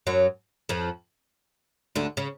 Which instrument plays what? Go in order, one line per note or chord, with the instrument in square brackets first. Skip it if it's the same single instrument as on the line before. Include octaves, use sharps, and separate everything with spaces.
[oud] F#2 F#3
F2 F3
D2 D3
C#3